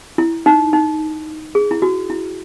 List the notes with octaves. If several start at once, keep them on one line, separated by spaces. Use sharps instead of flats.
E4
D#4
D#4
G#4
E4
F#4
E4